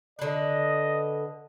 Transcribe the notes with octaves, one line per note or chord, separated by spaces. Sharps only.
D3 B4 D#5